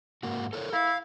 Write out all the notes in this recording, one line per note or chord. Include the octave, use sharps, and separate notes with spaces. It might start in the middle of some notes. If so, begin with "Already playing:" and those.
G#2 A#3 F#4
A4 A#4 C#5
E4 F5